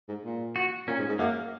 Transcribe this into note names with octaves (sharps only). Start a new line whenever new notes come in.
G#2
A#2
F#4
A#2 C#4
G#2
G#2
F#2 A#3